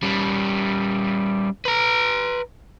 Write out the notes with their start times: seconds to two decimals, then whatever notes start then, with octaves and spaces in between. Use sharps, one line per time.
0.03 G3 C#4
1.65 B4 A#5